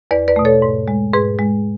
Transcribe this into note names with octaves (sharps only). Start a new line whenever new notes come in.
E2 B4 D5
B4 D5
B2 A3
A4 C#5
G#2
G#3
G#2 G#4 B4
G#3